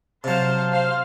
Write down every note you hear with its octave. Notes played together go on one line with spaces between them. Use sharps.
C3 F#3 C5 F5 A5
C5 F5